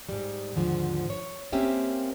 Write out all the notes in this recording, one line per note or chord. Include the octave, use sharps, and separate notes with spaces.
G#2 G3
D#2 G#2 D3 F3
C#5
A#3 C4 C#4 G4 C5 E5